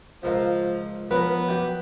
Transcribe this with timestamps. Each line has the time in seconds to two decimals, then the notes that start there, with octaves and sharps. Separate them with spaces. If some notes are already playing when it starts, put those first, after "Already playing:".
0.23 C#2 F3 A#4 F5
1.11 F3 B3 A#4 B4 C#5
1.47 F#2 G5 D6